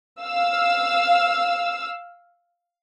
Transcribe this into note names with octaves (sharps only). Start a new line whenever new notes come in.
F5 E6